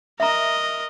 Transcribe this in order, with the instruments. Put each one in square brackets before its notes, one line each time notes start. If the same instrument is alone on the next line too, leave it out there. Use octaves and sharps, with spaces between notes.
[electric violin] A#4 D#5 [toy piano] E5 A#5